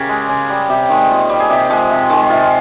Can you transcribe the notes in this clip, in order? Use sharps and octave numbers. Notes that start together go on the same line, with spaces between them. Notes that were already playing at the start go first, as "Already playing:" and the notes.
Already playing: C#3 G4 A#4
G#3
C#3
G3
C3 G4
D#3 G#3
A#2
G3
G#4
C3 G4
F3 G#3
C3
D#3 G#3
C3 F4